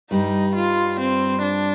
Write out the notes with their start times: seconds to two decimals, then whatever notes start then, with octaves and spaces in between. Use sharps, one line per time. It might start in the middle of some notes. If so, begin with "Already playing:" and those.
0.11 G2 G3 D#4
0.55 F4
1.00 C4
1.43 D4